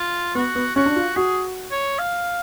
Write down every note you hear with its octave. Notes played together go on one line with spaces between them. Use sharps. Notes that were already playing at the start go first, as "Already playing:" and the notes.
Already playing: F4
B3 F#4
B3
C#4 F#4
D4
F4
F#4 G#4
C#5
F5